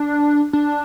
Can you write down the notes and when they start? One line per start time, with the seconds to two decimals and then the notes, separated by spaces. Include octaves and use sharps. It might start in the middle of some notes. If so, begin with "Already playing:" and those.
Already playing: D4
0.53 D4